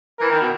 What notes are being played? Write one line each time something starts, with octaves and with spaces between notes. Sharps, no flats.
E3 A#4
D#3
B2